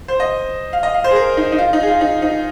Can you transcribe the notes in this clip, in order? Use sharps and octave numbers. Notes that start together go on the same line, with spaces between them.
C5
D#5
F5
D#5
F5
C5
G#4
A#4
D#4
D#4
F4
D#4
G#4
F4
D#4
D#4